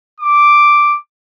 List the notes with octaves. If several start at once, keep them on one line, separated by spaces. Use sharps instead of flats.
D6